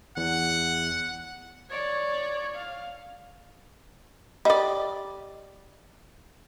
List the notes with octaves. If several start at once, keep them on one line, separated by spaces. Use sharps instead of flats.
E2 F#5
C#5 D5
F5
G3 D5 D#5